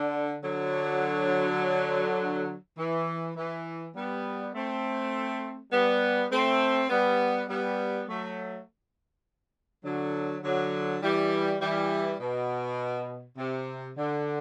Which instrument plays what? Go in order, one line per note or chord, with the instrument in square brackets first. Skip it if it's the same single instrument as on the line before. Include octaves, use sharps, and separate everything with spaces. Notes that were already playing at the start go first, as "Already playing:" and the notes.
Already playing: [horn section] D3
D3 F#3
E3
E3
G3 B3
A3 C4
G3 B3
A3 C4
G3 B3
G3 B3
F#3 A3
D3 F#3
D3 F#3
E3 G3
E3 G3
B2
C3
D3